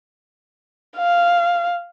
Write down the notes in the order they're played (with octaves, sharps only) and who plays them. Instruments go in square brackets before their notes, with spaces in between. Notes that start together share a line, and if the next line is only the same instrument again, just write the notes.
[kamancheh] F5